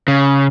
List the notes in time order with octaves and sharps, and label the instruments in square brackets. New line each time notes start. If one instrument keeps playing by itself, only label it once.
[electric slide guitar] C#3